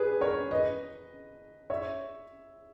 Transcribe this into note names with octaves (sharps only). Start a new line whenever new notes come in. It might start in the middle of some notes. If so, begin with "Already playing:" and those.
Already playing: G4 G#4 B4
A#4 C#5
B4 D#5
C#5 E5